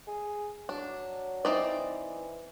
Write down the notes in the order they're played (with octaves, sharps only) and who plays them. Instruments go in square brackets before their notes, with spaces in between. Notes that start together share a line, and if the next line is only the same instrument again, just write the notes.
[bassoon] G#4
[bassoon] F#3 [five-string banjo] D4
[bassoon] E3 [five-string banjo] C4 D#4 D5